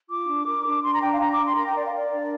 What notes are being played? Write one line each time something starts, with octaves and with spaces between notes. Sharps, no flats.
F4 D6
D4
A#4
D4
D4 C6
A#5
D4 G5
F5
D4 A#5
D6
D4
C6
A#4 A#5
G5
A#4 D5
F5
A#4 D5
D4